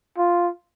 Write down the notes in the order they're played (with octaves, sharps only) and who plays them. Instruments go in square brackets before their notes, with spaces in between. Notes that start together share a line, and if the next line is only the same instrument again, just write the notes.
[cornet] F4